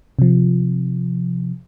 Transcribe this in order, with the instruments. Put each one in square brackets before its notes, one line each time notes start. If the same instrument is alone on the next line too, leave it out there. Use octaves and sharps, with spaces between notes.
[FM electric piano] C3 F3